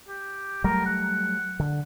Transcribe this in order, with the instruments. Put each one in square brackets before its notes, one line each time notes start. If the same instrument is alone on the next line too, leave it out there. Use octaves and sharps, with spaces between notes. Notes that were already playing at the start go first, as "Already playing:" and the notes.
[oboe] G4
[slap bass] F#3 G3 A3 [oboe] A#4
[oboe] F#5
[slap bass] D3